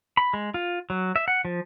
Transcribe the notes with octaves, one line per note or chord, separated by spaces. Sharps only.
B5
G#3
F4
F#3
E5
F#5
F3